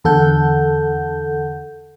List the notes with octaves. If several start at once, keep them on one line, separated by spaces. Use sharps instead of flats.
E2 D3 A4 F#5 G6